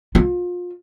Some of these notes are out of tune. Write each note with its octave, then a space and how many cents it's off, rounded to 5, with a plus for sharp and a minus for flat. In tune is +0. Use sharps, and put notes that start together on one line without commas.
F4 +30